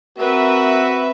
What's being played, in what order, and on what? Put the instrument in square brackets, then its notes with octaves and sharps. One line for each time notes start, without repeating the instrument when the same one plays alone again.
[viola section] C4 B4 E5 [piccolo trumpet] F#4 [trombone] A#4